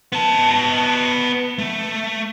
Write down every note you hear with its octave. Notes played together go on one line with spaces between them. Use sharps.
B3 A5
A3